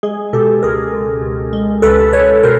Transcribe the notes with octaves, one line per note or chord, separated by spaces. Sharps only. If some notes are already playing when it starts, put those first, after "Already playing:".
G#3 G#4
B2 G4 A4
C#2 G#4 A#4
C#2
C#2
G#3
C#2 A4 B4
C#2 B4 C#5
B2 A#4 C5